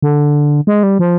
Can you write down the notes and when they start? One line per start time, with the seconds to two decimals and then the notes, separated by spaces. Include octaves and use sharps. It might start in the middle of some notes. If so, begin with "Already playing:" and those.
0.02 D3
0.67 G#3
0.83 G3
0.99 F3